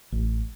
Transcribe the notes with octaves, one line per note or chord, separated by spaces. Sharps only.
A1